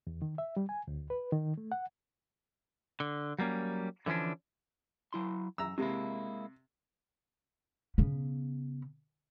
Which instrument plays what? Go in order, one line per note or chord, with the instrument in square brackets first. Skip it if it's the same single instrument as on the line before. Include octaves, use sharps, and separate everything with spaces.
[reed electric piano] E2
D#3
E5
G3
G#5
D2
B4
D#3
A3
F#5
[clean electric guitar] D3
F#3 G3 A#3 C#4
D3 E3 F3 C#4 D4
F#3 E4 C6
[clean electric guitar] F#2 [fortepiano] A#5 E6
[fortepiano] C3 [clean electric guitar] G#3 A#3 E4
[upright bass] C#3 B3